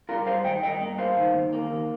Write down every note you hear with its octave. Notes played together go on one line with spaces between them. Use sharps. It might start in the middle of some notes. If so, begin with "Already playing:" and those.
G3 F4 A#4
G2 C5 F5
D#3 D#5 G5
G2 D#5 G5
A#3
G2 C5 F5
D#3
D#2
A#3
D#2